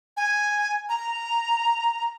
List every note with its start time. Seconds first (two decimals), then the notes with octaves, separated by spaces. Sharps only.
0.17 G#5
0.89 A#5